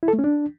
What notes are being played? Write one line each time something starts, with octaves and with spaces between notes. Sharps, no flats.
E4
A4
A3
C#4
D4